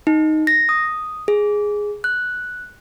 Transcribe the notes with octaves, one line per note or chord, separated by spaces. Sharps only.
D#4
A#6
D#6
G#4
F#6